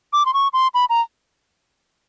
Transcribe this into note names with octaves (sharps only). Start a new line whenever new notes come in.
D6
C6
C#6
C6
B5
A#5